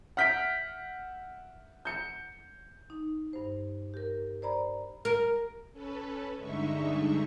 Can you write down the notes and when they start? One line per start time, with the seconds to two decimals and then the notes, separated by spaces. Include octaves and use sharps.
0.17 E5 F#5 F6 G6 B6 D7
1.85 G6 C#7
2.90 D#4
3.33 G2 C5
3.94 G4 A#4
4.42 C5 D5 A#5 B5
5.05 A#4
5.73 C#4 A4 B4
6.37 G2 D3 G#3 D#4 E5 C#6